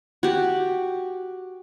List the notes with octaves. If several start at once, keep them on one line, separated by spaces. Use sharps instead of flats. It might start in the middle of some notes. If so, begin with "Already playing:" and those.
F#4 G4